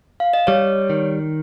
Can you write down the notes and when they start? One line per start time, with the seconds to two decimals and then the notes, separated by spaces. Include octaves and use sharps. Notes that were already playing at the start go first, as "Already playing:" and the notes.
0.20 F5
0.33 D#5
0.47 G3 C#5
0.90 D#3